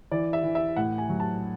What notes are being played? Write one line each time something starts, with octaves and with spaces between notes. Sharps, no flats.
E3 D5
E5
E3
E5
A2 F#5
G#5
F#3
A5